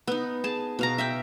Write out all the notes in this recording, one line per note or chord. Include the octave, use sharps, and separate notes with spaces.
B3 D#4
G#4 A5
B2 F5 A#5
E5 F5 G5